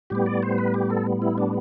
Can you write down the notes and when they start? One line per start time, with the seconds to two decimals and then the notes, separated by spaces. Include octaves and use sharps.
0.10 A2 G3 B3 G4
0.26 D5
0.43 C5
0.58 B4
0.74 G4
0.90 A4
1.22 E4
1.38 D4